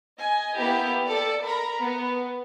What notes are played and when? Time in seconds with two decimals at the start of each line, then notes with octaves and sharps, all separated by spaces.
0.22 D#5 G#5
0.59 A#3 B3 E4 G4
1.06 A4 D5
1.44 A#4 A#5 B5
1.82 B3